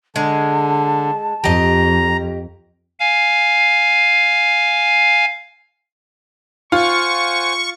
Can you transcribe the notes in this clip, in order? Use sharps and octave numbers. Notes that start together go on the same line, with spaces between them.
D3 G#3 A5
F2 G4 D#5 A#5
F5 G#5
F4 C5 F#5 G#5 C#6